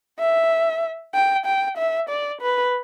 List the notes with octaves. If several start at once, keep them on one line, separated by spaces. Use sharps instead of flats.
E5
G5
G5
E5
D5
B4